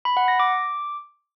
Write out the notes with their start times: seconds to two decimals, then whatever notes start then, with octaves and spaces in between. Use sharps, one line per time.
0.05 B5
0.17 F#5
0.28 A#6
0.40 D6